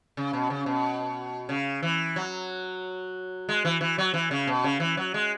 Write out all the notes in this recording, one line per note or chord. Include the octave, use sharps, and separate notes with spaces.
C#3
B2
C#3
B2
C#3
E3
F#3
G#3
E3
E3
F#3
E3
C#3
B2
C#3
E3
F#3
G#3